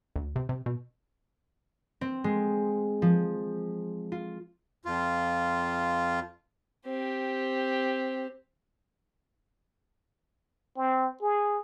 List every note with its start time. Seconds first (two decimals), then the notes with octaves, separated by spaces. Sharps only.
0.16 D2
0.36 C3
0.49 C3
0.66 B2
2.01 C4
2.24 G#3
3.02 F3
4.12 F4
4.85 F2 F4
6.86 C4 G4
10.77 C4
11.22 G#4